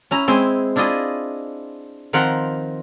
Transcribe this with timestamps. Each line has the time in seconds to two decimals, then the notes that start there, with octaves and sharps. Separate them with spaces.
0.11 C#4 E4 A#5
0.28 G#3 C4 E4 G#4
0.76 D4 E4 F4 G#4 D#5
2.13 D#3 F3 C4 A#4 F#5